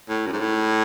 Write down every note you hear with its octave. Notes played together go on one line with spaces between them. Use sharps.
A2
F#2
G#2
A2